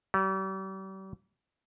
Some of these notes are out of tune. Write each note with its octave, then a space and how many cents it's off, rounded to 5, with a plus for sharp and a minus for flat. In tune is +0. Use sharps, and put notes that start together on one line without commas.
G3 -40